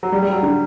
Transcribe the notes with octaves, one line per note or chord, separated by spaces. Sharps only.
F#3
G3
G3
F#3
D3